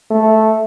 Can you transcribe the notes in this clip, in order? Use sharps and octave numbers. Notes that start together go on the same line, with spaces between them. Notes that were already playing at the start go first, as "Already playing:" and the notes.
A3